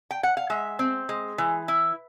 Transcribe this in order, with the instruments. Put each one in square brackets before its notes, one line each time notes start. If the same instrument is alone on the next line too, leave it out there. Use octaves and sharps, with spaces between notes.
[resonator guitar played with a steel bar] G5
F#5
F5
G#3 E5
C4
G#3
E3
E4